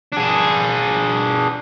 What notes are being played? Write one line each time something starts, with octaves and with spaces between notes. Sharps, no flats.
D4 G#4